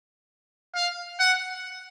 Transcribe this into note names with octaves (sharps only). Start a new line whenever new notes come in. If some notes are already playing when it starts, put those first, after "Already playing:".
F5
F#5